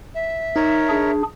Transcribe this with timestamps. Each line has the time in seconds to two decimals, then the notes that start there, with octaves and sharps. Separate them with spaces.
0.15 E5
0.56 D#4 A#4 C#5
0.89 D4 G#4